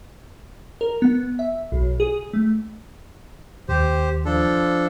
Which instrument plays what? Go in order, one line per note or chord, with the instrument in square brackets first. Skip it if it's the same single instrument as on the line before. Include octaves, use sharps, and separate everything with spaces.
[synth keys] A#4
B3
E5
B1
G#4
A3
[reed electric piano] D#2 [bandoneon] G4 C5
[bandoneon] F3 D4 A4